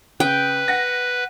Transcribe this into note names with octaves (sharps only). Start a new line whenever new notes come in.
C#3 B4 G5
F#5 A#6